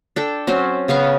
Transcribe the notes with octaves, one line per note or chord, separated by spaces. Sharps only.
D4 A4 G5
F#3 C4 C#4 C5
C#3 B3 F5 C#6